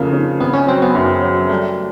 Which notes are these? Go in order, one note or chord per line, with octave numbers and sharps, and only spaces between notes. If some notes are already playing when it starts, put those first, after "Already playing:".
Already playing: F2 C#3 F3 A3 A#3
C#3
G#1 B3
C#4
F#3 C4
B3
F#2
F#3
G3 A3